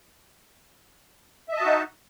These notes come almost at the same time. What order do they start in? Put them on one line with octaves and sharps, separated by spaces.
E5 D#5 A5 F#4 D#4